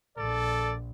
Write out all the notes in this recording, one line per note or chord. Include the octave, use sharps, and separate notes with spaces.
A#1 A4 D5